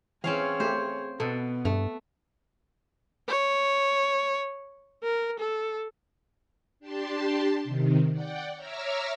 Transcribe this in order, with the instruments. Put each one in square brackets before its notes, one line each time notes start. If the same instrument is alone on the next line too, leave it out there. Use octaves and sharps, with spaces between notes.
[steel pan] E3 [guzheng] C4 C#4 F5 [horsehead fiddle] G#4 C#5
[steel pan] A3 G4 [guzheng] C5
[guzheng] B2 [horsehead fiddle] B3 [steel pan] A4
[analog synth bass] G2 [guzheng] A3
[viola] C#5
A#4
A4
[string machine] D4 G4 A5 C6
C3 D#3
D5 F#5 G5
C#5 E5 A#5 D6 E6 F6